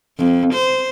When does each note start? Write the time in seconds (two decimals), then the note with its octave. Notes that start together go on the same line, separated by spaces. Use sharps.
0.18 F2
0.54 C5